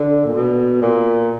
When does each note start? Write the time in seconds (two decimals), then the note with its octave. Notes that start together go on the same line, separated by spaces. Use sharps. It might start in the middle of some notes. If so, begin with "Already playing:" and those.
Already playing: D3
0.25 A#2
0.34 B2
0.82 A#2